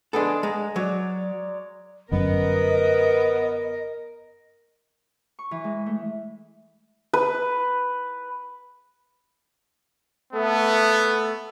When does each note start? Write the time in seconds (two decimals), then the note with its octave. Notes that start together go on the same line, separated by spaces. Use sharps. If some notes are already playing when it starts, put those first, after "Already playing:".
0.13 G#3 B3 D4 G#4 A4
0.43 G#3 A#5
0.76 F#3 C#5 D5
2.12 G1 F#2 B3 A#4 D#5
5.39 C#6
5.51 E3
5.64 G#3
5.86 A3
7.13 B4
10.33 A3 B3